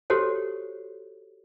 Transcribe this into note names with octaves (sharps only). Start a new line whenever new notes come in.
F#4 G4 A4 C5 C#5